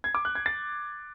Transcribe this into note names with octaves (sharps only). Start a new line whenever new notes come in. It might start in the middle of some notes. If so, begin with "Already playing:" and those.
G#6
D6
F#6
G#6
A6